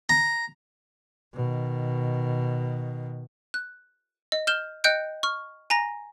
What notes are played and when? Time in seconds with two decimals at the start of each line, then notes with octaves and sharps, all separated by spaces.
0.09 A#5
1.34 B2 D#3
3.54 F#6
4.32 D#5
4.47 F6 G6 E7 G7
4.84 D#5 G5 F#6 G6 C#7 D7
5.23 C#6 F6
5.70 G#5 A#5 A#6